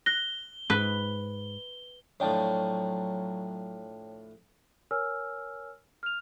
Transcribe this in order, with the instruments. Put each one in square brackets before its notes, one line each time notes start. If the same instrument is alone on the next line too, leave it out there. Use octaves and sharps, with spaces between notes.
[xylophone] F#6 A#6 [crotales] G7
[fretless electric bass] G#2 [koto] B4
[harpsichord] A2 F3 D4 [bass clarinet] F#3 [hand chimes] C#5 G5 A5
[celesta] A#4 C#5 G#5 E6 F6
F6 F7